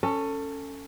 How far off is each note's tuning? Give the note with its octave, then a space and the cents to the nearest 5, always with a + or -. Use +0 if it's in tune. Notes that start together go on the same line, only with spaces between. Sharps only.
C#4 +0 A4 +20